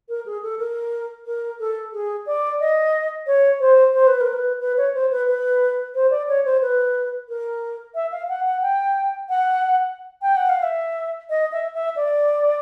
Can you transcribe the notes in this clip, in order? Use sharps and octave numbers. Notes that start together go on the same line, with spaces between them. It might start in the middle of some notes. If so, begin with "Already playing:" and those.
A#4
G#4
A4
A#4
A#4
A4
G#4
D5
D#5
C#5
C5
C5
B4
A#4
B4
B4
C#5
C5
B4
B4
C5
D5
C#5
C5
B4
A#4
E5
F5
F#5
F#5
G5
F#5
G5
F#5
F5
E5
D#5
E5
E5
D5